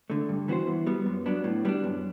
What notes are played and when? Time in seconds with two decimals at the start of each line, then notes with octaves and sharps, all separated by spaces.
0.10 D3 A3
0.29 G2
0.48 E3 B3 F#4 C5
0.67 E3
0.87 G3 B3
1.06 F#2
1.26 F#3 B3 D4
1.44 A2
1.65 G3 B3 D4
1.84 F#2